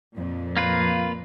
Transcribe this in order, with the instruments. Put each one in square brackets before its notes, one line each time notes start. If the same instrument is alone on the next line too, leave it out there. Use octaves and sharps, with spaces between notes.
[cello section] F2 A#2 F3
[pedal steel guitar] A#3 F4 B4